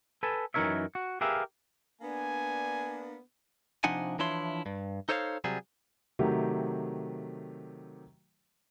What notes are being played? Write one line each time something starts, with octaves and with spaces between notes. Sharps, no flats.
A4 B4 G#5 A5
F#2 E3 D#4 A#4 C#5 E5
F#4
G4 G#4 A#4 B4 E5 F5
A#3 B3 D4 G#5
C3 F3 D4 D#4 F#5 G#5
E3 F3 D4 E4 C#5 C6
G2
D#4 A4 C5 C#5 D#5 F5
C3 F#3 G3 G#4
C3 D#3 F#3 A3 G4